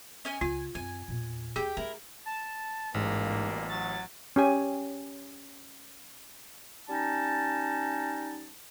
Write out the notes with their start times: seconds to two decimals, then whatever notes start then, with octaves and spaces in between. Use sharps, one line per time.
0.25 C#4 D#5 G#5
0.41 C#2 F4 G#5
0.75 F#2 C4 G#5
1.08 E2 A#2
1.56 D#2 A#3 G4 G#4 G5
1.77 A3 E4 A#4
2.26 A5
2.94 A1 G#2 B2 G3 A#3
3.69 F#3 A6
4.36 C#4 G4 G#5
6.89 G3 C#4 D#4 A5